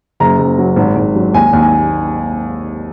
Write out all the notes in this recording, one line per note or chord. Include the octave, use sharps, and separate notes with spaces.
F#1 A#5
F#1
F#3
G#1
G#1
F#3
D#2 G#5
D#2
G#5